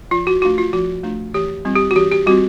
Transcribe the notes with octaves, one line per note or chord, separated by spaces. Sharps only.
F3 F4
F#4
A3 D4 F4 F#4
F4
F3 F#4
A3 D4 F4
E3 G4
G3 C4 F4
G4
F#4
E3 G4
G4
G3 C4 F4 F#4